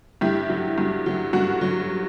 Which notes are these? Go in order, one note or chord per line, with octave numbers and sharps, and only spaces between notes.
G2 E4 G4
F#3
G2
F#3
G2 F#4
F#3